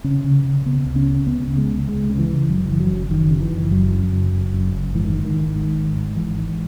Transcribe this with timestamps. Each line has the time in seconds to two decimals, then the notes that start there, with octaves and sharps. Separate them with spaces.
0.04 C#3 C#4
0.24 C#3
0.44 C#3
0.66 C#3 B3
0.85 C#2
0.96 C#4
1.06 C#3
1.27 C#2 B3
1.47 C#3
1.57 G#3
1.67 C#2
1.88 C#2 G#3
2.09 C#3
2.19 E3
2.29 C#3
2.50 F#1 F#3
2.69 F#1 E3
2.80 F#3
2.90 F#2
3.10 F#1 D#3
3.30 C#3
3.41 E3
3.52 F#1
3.71 F#2 F#3
3.93 F#2
4.13 F#1
4.33 F#1
4.53 F#2
4.73 F#1
4.95 G#2 E3
5.05 D#3
5.14 G#2
5.25 D#3
5.35 G#1
5.55 G#2
5.76 G#1
5.96 G#2
6.16 G#1 E3
6.37 G#2